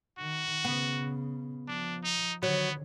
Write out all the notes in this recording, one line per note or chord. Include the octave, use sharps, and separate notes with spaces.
D#3 F#4
C#3 B3
F3 D4
D#4
D3 D#3 F#3 B3